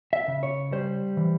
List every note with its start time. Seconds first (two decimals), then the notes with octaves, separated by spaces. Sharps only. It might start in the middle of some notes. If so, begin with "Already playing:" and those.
0.13 E5
0.28 C#3
0.43 C#5
0.72 G3 C5
1.17 E3